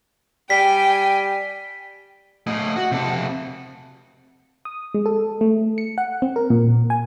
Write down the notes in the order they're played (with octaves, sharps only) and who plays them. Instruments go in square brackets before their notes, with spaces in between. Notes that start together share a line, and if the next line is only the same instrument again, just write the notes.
[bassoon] G3 [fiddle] G5 G#5 [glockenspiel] B6
[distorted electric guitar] A2 D#5
F#4
C3 A4
[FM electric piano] D#6
G#3
A4
A3
C#7
F#5
C4
A#4
A#2
G#5